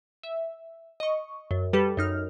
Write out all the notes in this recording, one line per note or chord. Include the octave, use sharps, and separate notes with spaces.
E5
D#5 C#6
F#2
G3 G4 A4 B4
F#2 D#4 F6